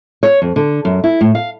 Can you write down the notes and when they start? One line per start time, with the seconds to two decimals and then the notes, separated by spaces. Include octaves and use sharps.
0.23 C#5
0.42 F2
0.56 D3
0.85 F#2
1.04 E4
1.21 A2
1.35 F5